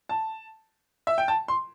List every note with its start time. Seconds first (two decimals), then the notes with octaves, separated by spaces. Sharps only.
0.09 A5
1.07 E5
1.18 G5
1.28 A5
1.48 C6